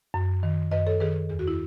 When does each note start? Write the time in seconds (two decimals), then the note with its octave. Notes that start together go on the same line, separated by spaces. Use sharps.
0.14 F#2
0.43 D#3
0.71 F#2 B4 D#5
0.87 A4 C#5
1.00 D#3 G#4 B4
1.30 E2 G#4
1.39 F#4
1.48 E4